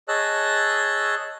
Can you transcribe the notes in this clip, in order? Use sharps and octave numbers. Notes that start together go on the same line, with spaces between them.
G#4 C#5 D#5 A5 E6 F#6